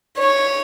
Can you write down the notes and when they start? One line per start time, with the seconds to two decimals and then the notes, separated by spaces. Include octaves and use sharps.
0.19 C#5